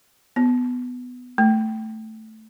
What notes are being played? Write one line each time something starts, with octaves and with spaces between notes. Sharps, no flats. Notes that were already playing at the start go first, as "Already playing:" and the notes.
B3
A3